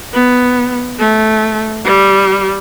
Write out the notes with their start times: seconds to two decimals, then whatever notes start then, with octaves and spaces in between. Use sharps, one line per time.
0.13 B3
0.98 A3
1.84 G3